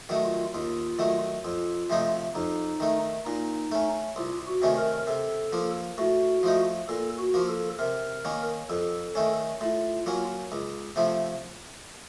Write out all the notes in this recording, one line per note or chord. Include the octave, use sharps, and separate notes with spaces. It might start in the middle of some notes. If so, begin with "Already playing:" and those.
D#3 F#3 A3
F4
D#2 F4
D#3 F#3 A3
F2 F4
C3 F3 A3 D#4
F2 D#4
D#3 A3
A#2 D#4
A3 C#4
C2 F4
F#4
C3 D#3 A3 C#4
A#4
C3 A4
F3 A#3
A2 F#4
F3 A3 D#4
A#2 A4
F#4
F3 A#3
A4
C3 A#4
D#3 A#3 C#4
F2 A4
D#3 A3 C#4
A2 F4
F#3 A#3 C#4
C#2
C3 F3 A3